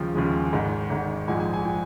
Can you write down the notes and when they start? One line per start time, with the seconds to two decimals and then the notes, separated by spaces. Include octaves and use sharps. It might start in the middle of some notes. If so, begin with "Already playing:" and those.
Already playing: D#2 C#3 F3 G#3 G5
0.15 D#2 C#3 F3 G#3
0.52 G#1 G#2 D#3
0.90 G#1 G#2 D#3
1.28 A#1 G#2 F3 G#5
1.40 G#5
1.54 G#5
1.65 F3 G5